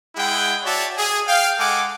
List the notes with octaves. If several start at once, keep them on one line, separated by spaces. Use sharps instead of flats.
G#3 E4 G#4 F#5 G5
F#4 C#5 D5 E5 A5
G#4
F5 G5
G#3 A4 F#5 G#5 D6